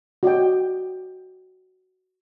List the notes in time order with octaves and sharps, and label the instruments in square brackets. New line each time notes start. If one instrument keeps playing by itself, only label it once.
[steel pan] F#4 D5 D#5 G5